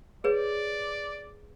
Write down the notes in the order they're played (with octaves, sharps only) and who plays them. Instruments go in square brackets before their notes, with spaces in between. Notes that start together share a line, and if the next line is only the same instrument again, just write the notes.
[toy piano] G#4 B4 C#5 [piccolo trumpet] D5